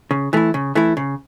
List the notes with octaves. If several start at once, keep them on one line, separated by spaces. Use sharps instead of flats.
C#3
E3 A3 E4
C#3
E3 A3 E4
C#3